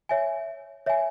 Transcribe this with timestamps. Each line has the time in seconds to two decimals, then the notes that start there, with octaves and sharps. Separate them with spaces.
0.09 C#5 E5 G#5
0.86 C#5 E5 G#5